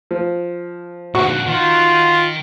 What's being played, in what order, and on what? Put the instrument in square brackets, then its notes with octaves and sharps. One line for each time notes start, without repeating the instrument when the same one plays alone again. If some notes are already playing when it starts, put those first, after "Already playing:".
[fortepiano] F3
[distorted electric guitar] A#2 D3 [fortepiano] F#4 F#5 C#6
[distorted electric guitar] D#3 [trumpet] F4